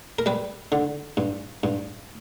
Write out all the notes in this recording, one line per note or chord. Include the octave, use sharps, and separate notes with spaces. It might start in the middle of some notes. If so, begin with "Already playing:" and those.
A#4
G3 B4
D3
G2
G2